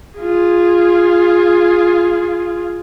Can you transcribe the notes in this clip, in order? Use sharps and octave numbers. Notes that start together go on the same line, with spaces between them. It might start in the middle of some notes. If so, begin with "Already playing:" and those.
F4 G#4